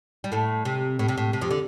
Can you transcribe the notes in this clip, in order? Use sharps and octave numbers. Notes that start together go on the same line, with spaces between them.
G3
A2 A3
C3
A2
C3
A2
C3
F2 F3
D3